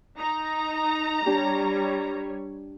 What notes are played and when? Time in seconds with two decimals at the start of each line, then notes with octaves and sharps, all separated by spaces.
0.19 D#4 A#5
1.26 G3 D4 G4 C#5